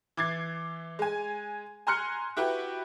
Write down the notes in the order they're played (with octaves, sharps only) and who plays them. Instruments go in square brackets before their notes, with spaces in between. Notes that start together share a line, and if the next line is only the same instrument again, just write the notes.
[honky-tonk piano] E3 D6 G#6 A6 C7
G#3 G#5
G#5 A#5 C6 F6 F#6 C#7
E4 F#4 G4 B4